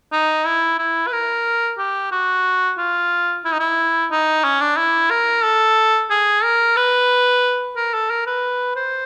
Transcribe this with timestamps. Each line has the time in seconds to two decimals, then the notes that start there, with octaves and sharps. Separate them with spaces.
0.12 D#4
0.45 E4
0.78 E4
1.07 B4
1.12 A#4
1.78 G4
2.11 F#4
2.78 F4
3.45 E4
3.52 D#4
3.60 E4
4.11 D#4
4.44 C#4
4.61 D4
4.77 E4
5.10 A#4
5.43 A4
6.10 G#4
6.43 A#4
6.77 B4
7.77 A#4
7.94 A4
8.10 A#4
8.26 B4
8.76 C5